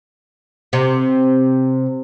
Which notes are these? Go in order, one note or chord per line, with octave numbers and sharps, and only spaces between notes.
C3